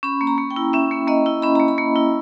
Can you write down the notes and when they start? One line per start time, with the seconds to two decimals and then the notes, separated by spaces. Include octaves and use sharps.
0.03 C#4 B5
0.21 A#3
0.27 A#5
0.38 A#3
0.50 G5
0.56 E4
0.73 C#4 E5
0.91 A#3
1.07 A#3 D#5
1.26 E4
1.42 C#4 B5
1.55 A#3 A#5
1.68 B5
1.78 A#3
1.96 E4